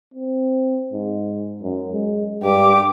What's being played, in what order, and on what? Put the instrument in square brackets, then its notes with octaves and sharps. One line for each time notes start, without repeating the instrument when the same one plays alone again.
[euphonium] C4
G#2
F#2
G#3
[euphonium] G2 [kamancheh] G4 D6